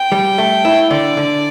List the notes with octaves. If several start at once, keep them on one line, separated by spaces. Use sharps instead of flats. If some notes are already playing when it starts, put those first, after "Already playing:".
Already playing: G5
G3
A3
E4
D3 D5
D3